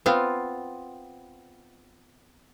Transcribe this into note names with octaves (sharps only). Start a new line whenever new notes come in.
B3 C4 F4